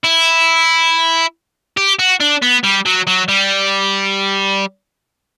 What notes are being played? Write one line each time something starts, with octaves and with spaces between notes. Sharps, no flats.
E4
G4
F#4
D4
B3
G3
F#3
F#3
G3